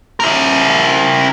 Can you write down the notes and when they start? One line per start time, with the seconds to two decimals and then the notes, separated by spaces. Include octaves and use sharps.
0.20 E4 A#4